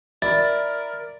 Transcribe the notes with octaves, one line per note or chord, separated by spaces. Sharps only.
E4 A#4 D5 A6